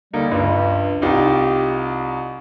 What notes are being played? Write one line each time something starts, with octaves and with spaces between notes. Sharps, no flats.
D3 G3 A#3 D#4
C#2 G2
C2 D#4 F4 G4